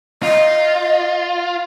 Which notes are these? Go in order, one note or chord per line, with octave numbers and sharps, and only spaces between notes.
F4 D#5